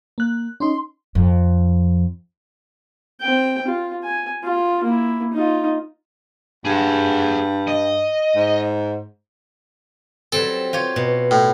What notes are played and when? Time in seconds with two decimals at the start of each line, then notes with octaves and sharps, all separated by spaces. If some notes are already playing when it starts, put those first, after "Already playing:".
0.18 A#3 F#6
0.60 C#4 D#4 C6
1.15 F2
3.21 C4 G5
3.67 F4
4.04 G#5
4.43 F4
4.84 A#3 E4
5.33 D#4 F4
6.65 G2 G#4 F#5
7.67 D#5
8.35 G#2
10.32 F#3 G3 C4 A4
10.73 F4 G4 C#5
10.96 B2
11.31 A2